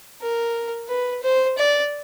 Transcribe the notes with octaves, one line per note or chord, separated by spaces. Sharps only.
A#4
B4
C5
D5